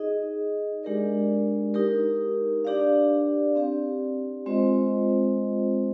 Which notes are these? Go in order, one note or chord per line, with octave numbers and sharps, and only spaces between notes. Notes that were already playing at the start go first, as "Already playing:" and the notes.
Already playing: D#4 G#4 D#5
G#3 D4 G4 A#4 D5
D#4 G4 A#4
D4 G4 D5 F5
C4 G4 D5
G#3 C4 F4 C5 D#5